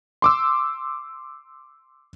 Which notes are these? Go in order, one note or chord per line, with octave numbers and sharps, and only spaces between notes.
C6 D6 E6